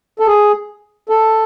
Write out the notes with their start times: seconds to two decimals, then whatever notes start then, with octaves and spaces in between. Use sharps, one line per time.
0.19 A4
0.27 G#4
1.09 A4